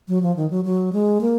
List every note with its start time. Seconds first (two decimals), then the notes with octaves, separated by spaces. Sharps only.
0.08 F#3
0.23 F3
0.36 D#3
0.50 F#3
0.65 F#3
0.93 G#3
1.21 A#3